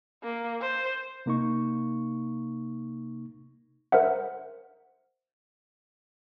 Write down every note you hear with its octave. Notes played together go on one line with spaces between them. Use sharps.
A#3
C5
C3 A#3 D#4 C#6
A#4 C5 E5 F#5